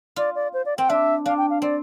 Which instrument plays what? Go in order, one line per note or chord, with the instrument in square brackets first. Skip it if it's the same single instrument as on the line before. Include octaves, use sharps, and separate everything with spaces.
[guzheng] F4 [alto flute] D5
[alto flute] D5
C5
D5
[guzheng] C4 [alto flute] G5
[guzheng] D4 [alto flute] E5
[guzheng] D4 [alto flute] F5
[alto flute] G5
F5
[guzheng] C4 [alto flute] D5